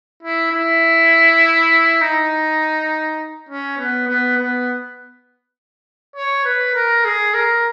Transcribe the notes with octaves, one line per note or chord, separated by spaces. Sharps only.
E4
E4
D#4
C#4
B3
B3
B3
C#5
B4
A#4
G#4
A#4